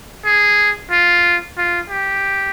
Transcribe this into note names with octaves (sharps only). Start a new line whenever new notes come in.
G#4
F4
F4
G4